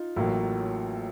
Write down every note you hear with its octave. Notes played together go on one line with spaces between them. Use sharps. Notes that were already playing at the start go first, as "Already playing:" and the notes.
Already playing: D#4 F4
A1 A2 F#3 A#3